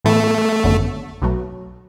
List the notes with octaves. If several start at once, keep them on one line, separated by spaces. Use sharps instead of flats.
A2 E3 A3 B3 E4
G#1 F#2 D3 F#3 B3
B1 B2 F#3 A3